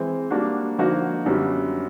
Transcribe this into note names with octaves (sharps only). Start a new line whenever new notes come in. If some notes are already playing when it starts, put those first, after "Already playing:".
Already playing: E3 G#3 C4
G3 A#3 D4 F#4
D3 F3 A#3 D#4 F#4
F#2 D3 G3 B3